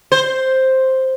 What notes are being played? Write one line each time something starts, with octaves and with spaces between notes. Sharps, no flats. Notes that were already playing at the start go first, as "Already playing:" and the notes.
C5